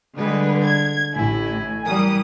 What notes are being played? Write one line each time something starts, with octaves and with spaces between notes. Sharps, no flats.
D3 G3 G#3 B4
D4 G#6
A1 A2 E4 G#5
E3 G3 A#4 D#6